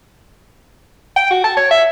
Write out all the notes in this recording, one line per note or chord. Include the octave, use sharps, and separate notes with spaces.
G5
F#4
A5
C#5
E5